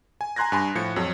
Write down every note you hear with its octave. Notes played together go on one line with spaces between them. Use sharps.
G#5
G#5 A#5 C6 F#6 G#6 A#6
G2 G#5 C6
A2 F3 G#6 C#7
F2 F#3